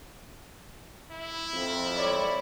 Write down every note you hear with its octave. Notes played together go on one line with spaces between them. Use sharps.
E4
F2
C#5 D5 B5